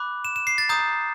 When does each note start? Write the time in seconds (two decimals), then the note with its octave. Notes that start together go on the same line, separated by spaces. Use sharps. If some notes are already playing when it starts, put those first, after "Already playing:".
Already playing: B5 D6 F#6
0.25 E7
0.36 E7
0.47 C7
0.58 A6
0.69 A#5 D#6 G6